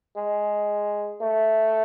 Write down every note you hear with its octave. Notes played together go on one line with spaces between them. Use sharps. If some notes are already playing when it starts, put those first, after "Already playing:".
G#3
A3